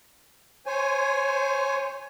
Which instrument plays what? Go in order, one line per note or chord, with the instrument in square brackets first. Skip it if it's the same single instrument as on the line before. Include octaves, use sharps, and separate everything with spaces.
[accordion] C5 C#5 G#5